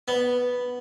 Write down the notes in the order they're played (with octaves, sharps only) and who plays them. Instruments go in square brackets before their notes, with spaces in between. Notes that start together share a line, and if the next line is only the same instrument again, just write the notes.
[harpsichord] B3